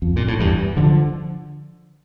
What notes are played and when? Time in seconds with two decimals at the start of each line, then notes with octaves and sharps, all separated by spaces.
0.02 F2
0.16 A#2
0.28 A2
0.40 E2 G2
0.77 D3 F3